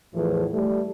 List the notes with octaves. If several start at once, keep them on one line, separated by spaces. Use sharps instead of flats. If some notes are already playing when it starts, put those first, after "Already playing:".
E2 A2 E3 F3
G3 A3